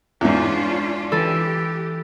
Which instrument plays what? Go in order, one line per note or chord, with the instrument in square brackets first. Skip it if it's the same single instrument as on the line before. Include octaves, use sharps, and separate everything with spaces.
[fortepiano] E2 G#2 [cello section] C#4 D4 F4
[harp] E3 A4 [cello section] G4